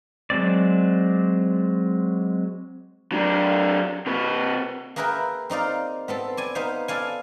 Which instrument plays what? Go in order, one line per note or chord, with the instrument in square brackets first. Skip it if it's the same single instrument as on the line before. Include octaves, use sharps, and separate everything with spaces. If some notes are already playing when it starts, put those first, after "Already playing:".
[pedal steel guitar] F#3 G#3 C4 D5
[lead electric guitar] F#3 D4
C3 B4
[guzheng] A#3 G#4 A#4 B4 E5 G5
C4 D#4 D5 F5
B3 C4 A4
D5 G#5
B3 D#4 C5 F5
A4 D5 F5 G#5